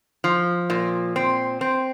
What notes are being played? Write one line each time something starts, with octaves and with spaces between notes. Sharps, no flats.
F3
A#2
C4
C4